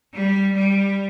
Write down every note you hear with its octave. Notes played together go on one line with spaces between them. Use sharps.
G3
G3